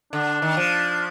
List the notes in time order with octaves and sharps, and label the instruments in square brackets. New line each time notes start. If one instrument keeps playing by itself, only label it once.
[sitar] D3 [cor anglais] D4
[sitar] D#3
F3